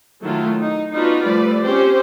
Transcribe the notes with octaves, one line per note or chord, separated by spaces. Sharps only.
D#3 F#3 A3 E4 F4
D#4
B3 D4 D#4 F4 F#4 B4
F3 G3 A3 B4 D5
C4 C#4 G4 C5